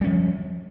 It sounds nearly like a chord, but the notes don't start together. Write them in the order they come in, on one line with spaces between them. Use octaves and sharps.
G3 C#4 F3